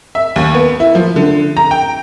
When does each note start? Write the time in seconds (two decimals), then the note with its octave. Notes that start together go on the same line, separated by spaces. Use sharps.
0.15 E5
0.36 D#2
0.55 B3
0.80 E4
0.95 F3
1.16 D3
1.57 A#5
1.71 G5